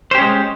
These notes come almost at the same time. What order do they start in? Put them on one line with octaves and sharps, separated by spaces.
C5 G4 C#4 G#3